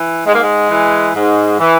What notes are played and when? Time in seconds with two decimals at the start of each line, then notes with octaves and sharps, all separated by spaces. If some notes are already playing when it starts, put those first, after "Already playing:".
Already playing: E3
0.25 G#2 G#3
0.33 A#3
0.40 G#3
0.70 E3
1.15 G#2
1.59 E3